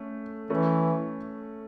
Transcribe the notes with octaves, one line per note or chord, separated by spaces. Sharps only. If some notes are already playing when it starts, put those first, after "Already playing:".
Already playing: A3 C#4
E3 A3 C#4